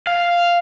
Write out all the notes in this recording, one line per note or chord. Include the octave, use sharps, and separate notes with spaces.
F5